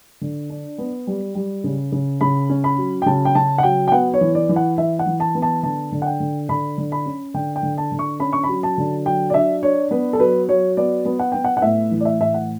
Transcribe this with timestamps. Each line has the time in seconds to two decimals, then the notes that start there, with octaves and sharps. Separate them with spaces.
0.21 D3
0.50 D4
0.78 B3
1.07 G3
1.35 G3
1.64 C#3
1.92 C#3
2.21 C#3 B5
2.50 C#4
2.64 B5
2.78 F#3
3.02 G5
3.06 C#3 A5
3.25 G5
3.35 C#3 A5
3.58 F#5
3.63 F#3 G5
3.88 G5
3.92 B3 F#5
4.14 C#5
4.21 E3
4.35 D5
4.49 E3
4.56 F#5
4.78 E3 E5
4.99 F#5
5.06 E3
5.20 A5
5.35 B3
5.42 A5
5.63 D3 A5
5.92 D3
6.02 F#5
6.06 G5
6.20 D3
6.49 D3 B5
6.78 D3
6.92 B5
7.06 C#4
7.34 D3 G5
7.56 G5
7.63 D3
7.78 A5
7.92 D3
7.99 C#6
8.20 C#4 B5
8.33 C#6
8.44 B5
8.49 F#3
8.63 A5
8.78 D3
9.06 F#3 G5
9.30 D5
9.34 D4 E5
9.63 D4 C#5
9.91 B3 B4
10.13 A4
10.20 F#3 B4
10.49 F#3 C#5
10.77 B3 D5
11.06 B3
11.19 F#5
11.32 B3 G5
11.44 F#5
11.57 F#5
11.62 A2 E5
11.91 E3
12.00 D5
12.05 E5
12.19 A2 E5
12.34 F#5